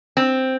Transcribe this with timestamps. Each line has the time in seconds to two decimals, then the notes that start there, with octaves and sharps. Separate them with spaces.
0.17 C4